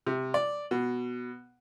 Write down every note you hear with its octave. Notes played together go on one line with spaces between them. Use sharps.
C3
D5
B2